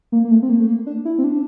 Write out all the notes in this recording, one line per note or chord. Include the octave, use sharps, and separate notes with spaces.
A#3
A#3
A3
C4
A#3
A3
A#3
D4
E4
C4
D4